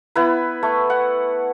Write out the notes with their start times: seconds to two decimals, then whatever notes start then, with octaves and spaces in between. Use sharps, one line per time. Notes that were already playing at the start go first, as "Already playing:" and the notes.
0.16 B3 E4 B4
0.63 A3
0.90 F#5